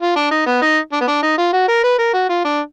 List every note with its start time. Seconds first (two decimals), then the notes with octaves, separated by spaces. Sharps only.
0.01 F4
0.16 D4
0.31 D#4
0.47 B3
0.62 D#4
0.92 D4
1.01 B3
1.08 D4
1.23 D#4
1.38 F4
1.53 F#4
1.68 A#4
1.84 B4
1.99 A#4
2.14 F#4
2.29 F4
2.44 D4